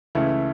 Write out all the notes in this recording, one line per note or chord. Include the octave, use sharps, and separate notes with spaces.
C#2 C#3 E3 A3 E4